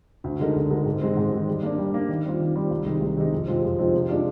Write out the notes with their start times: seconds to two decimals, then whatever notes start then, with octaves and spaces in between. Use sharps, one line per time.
0.24 D2
0.40 D3 G#3 D#4 A#4
0.56 D2
0.70 D3 G#3 D#4 A#4
0.86 G#2
1.01 D#3 G#3 C4
1.17 G#2
1.32 D#3 G#3 C4
1.47 G3
1.63 A#3 D4
1.78 G3
1.94 A#3 D4
2.09 D#3
2.25 G3 C4 F4
2.40 D#3
2.55 G3 C4 F4
2.71 C2
2.86 C3 D#3 G#3 D#4
3.01 C2
3.17 C3 D#3 G#3 D#4
3.32 F2
3.48 C3 F3 G#3 C4
3.64 F2
3.79 C3 F3 G#3 C4
3.94 C3
4.09 F3 G#3 D4 F4